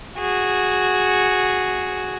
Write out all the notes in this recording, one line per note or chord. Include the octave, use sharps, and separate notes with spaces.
F#4 G#4